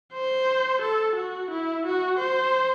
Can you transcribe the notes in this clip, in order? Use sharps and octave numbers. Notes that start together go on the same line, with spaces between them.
C5
A4
F#4
E4
F#4
C5